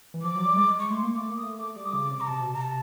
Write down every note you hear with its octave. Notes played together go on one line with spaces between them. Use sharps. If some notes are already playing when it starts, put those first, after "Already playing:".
E3
F3 D6
F#3
G3
G#3
C#6
A3 C6
A#3
A3 D6
A#3
D#6
A3
A3 D6
G3
D#6
C#3 D6
C3
A#5
C3 A5
B2
C3 A#5
A5